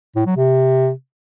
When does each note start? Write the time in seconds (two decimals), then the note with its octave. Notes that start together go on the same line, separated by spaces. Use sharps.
0.16 A2
0.26 F#3
0.36 C3